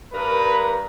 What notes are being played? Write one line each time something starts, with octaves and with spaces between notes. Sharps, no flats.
G2 A#4 B4